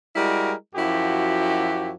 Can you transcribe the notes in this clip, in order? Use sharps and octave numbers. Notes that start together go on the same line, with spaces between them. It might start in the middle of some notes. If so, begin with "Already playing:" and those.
G3 G#3 E4 F#4 A#4
F#2 F3 E4 F#4 G4